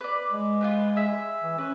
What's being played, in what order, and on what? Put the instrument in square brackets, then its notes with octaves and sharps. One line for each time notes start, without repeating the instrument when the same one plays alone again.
[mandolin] B4 D5
[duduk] G#3
[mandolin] F4 G4 B4
G#4 E5
[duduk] E3
[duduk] C#4 [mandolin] B4